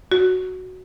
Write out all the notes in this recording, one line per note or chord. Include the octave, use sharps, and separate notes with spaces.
F#4